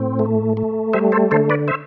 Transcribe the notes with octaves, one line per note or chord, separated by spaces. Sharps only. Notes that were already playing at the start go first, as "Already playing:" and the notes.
Already playing: A2 C4
A3
A3
G3 C5 E5
A4 C5
D3 A4 C5
B4 D5
C5 E5